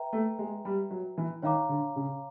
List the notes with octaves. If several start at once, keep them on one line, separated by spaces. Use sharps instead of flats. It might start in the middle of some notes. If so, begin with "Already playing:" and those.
Already playing: B4 E5 G5 A#5
A3
G#3
G3
F#3
E3
D#3 C#5 F5 A#5 D6
D3
C#3